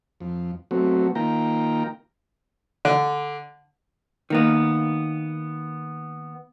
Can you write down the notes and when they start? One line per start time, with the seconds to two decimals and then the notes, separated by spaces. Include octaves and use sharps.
0.20 F2
0.71 F#3 A3 B3 C4 F#4
1.15 D#3 A#3 F4 G5 A#5
2.85 D3
4.30 D#3 A#3 B3